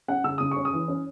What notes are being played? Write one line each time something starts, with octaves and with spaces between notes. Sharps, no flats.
C#4 F#5
C#3 E6
C#3 D#6
C#4 C#6
D#6
E3
C#4